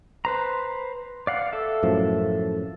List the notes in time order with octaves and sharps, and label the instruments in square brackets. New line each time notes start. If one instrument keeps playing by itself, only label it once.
[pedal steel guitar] B4 C5 A#5
D5 F5 F#5
A4 E5
[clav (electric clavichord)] F#2 A2 F3